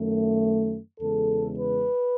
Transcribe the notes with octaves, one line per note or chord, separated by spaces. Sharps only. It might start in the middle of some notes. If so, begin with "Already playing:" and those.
Already playing: F#2 D#3 A3
E2 C#3 G#3 A4
B4